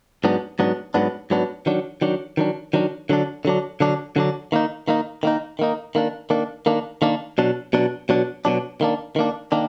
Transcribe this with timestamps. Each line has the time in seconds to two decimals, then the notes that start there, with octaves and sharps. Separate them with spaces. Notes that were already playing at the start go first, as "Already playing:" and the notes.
0.24 G#2 F#3 B3 D4
0.59 G#2 F#3 B3 D4
0.94 G#2 F#3 B3 D4
1.30 G#2 F#3 B3 D4
1.66 D#3 F#3 D4
2.01 D#3 F#3 D4
2.37 D#3 F#3 D4
2.73 D#3 F#3 D4
3.09 D3 F#3 D4
3.45 D3 F#3 D4
3.80 D3 F#3 D4
4.16 D3 F#3 D4
4.52 D#3 A#3 D#4
4.88 D#3 A#3 D#4
5.23 D#3 A#3 D#4
5.59 D#3 A#3 D#4
5.95 D#3 A#3 D4
6.30 D#3 A#3 D4
6.66 D#3 A#3 D4
7.02 D#3 A#3 D4
7.38 B2 F#3 D4
7.73 B2 F#3 D4
8.09 B2 F#3 D4
8.45 B2 F#3 D4
8.81 D#3 A#3 D4
9.16 D#3 A#3 D4
9.52 D#3 A#3 D4